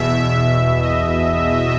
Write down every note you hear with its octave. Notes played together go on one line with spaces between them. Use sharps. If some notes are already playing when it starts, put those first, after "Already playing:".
Already playing: E2 B2 E5
D#5